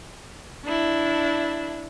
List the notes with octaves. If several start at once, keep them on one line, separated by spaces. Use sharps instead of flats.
D4 E4